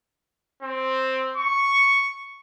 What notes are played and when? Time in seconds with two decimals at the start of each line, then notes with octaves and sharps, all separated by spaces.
0.63 C4
1.37 C#6